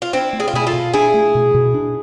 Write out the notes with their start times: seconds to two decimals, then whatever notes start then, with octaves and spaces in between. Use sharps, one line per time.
0.02 F4
0.13 C4 D4 E4
0.33 A3
0.40 G#4
0.48 F4
0.53 B2 E4 G#4
0.67 F4 A4
0.73 B2
0.94 D4 E4 G#4
1.14 A3
1.35 B2
1.54 B2
1.74 D4